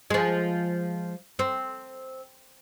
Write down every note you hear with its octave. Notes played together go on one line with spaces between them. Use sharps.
F3 G#3
C4